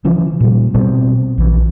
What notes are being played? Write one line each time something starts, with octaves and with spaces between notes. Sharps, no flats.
C#3 E3 F3 C#4
A#2 G3
B2 G3 C4
A#1 E3